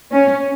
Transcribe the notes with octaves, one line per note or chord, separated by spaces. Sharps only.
C#4